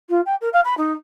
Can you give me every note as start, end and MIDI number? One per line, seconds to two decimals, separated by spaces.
0.10 0.21 65
0.26 0.35 79
0.41 0.49 70
0.53 0.60 77
0.65 0.74 83
0.77 0.93 63